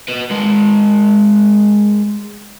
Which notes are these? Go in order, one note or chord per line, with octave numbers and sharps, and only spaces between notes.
B4 D#5
G#3 A#4